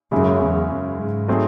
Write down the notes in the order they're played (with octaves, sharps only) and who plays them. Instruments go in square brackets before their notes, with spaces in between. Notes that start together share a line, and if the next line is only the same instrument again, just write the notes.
[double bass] F#2 [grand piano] C#3 G#3 C#4 E4
[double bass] E2
F#2
G#2
[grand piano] F#3 A3 C4 D#4 G#4